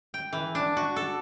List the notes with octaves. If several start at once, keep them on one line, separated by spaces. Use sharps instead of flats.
G5
E3
D4
F#4
A4